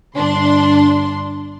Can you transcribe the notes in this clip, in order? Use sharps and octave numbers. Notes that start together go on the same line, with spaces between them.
G1 D4 C6